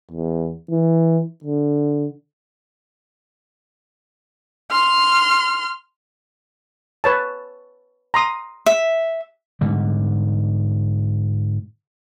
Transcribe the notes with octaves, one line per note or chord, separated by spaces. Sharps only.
E2
E3
D3
C6 F6
B4 C#5 A5
A#5 C6 D#6
E5
G#2 D3 G3